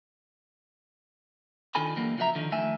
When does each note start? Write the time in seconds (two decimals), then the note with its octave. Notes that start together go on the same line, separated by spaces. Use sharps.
1.75 D#3 D4 F4 A4 G#5 B5
1.96 D3 E3 F#3 G3 A#3 B3
2.17 C#3 F3 F#4 C5 E5 A#5
2.35 D3 D#3 F3
2.51 D#3 F3 A3 E5 G#5